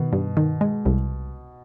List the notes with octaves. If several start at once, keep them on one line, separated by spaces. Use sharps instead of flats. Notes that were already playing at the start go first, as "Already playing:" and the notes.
Already playing: B2 D#3
G2
D#3
G#3
C2